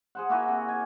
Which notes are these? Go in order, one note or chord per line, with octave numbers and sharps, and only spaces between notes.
G#4 C5 F#5
A#3 E4 F#4 G#5
C3
G#5